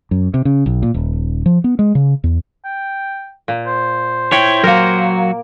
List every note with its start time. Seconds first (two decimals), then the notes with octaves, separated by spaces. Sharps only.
0.11 F#2
0.34 C3
0.45 C#3
0.66 B1
0.83 A#2
0.94 D#1
1.46 F3
1.64 B3
1.79 G#3
1.95 C#3
2.24 E2
2.65 G5
3.48 A#2
3.66 C5
4.32 E4 C#5 G5
4.63 F#3 A#3 F#4 A#4